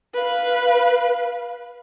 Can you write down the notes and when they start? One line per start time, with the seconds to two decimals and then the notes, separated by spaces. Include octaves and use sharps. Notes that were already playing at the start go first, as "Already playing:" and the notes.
0.15 B4 F5